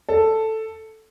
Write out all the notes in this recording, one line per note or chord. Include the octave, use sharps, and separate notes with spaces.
A4